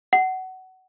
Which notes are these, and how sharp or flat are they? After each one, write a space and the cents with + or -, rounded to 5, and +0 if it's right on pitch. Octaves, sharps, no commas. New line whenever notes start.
F#5 +20